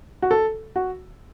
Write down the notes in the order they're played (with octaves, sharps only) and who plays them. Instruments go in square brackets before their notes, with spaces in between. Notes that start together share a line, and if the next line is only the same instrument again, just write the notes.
[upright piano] F#4
A4
F#4